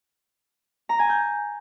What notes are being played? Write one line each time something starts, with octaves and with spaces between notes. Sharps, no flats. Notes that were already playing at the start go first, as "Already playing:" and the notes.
A#5
G#5
G6